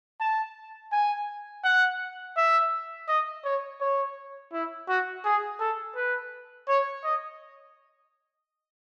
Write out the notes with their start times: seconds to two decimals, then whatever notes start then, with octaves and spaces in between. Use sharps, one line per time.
0.20 A5
0.92 G#5
1.64 F#5
2.37 E5
3.08 D#5
3.44 C#5
3.80 C#5
4.53 E4
4.88 F#4
5.25 G#4
5.60 A4
5.96 B4
6.68 C#5
7.04 D#5